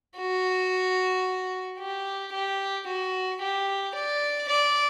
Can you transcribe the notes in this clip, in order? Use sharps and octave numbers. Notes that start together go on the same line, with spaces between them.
F#4
G4
G4
F#4
G4
D5
D5